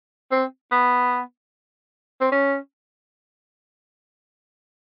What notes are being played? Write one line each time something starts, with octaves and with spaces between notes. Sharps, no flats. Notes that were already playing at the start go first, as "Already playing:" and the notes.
C4
B3
C4
C#4